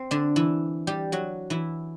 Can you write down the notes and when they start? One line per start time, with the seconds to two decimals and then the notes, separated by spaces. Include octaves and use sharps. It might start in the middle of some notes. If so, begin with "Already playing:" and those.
Already playing: C4
0.11 D3 D4
0.36 E3 E4
0.87 G3 G4
1.12 F#3 F#4
1.50 E3 E4